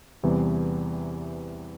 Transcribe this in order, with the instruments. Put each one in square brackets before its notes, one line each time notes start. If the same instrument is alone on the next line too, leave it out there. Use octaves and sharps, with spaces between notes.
[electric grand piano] E2 C3 E3 G3